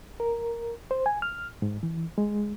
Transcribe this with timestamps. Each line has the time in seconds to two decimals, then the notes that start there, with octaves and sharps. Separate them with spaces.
0.20 A#4
0.91 C5
1.06 G#5
1.22 F6
1.62 G#2
1.83 E3
2.18 G#3